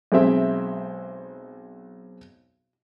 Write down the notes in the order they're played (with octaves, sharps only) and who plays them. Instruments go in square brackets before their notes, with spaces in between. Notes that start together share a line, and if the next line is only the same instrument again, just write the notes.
[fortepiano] B1 G#3 C4 E5